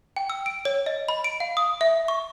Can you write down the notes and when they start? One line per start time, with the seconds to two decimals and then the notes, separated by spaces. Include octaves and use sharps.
0.16 G5
0.30 E6
0.46 D7
0.65 C#5
0.86 D#5
1.08 B5
1.24 D7
1.40 F5
1.57 D#6
1.81 E5
2.08 C#6